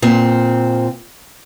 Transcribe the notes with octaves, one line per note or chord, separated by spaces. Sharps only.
A#2 C4